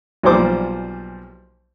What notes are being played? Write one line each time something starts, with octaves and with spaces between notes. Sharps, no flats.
B1 A#2 F3 G3 C5 D6